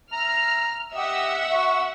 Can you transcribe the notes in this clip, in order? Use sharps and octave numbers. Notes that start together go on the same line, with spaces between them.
E5 A#5 F6
G4 D#5 E5 F#5 E6
F#4 C#6